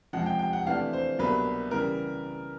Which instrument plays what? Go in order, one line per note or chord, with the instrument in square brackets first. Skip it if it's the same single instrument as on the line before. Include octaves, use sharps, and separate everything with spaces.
[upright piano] F2 C3 F3 G#3 F#5
G5
G5
F#5
C3 E3 A3 D4 F5
C5
C2 B2 F#3 A#3 D4 B4
C#3 E3 G3 A#4